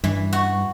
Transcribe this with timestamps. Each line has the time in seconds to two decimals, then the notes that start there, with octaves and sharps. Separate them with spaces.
0.04 G2 E3
0.33 F#4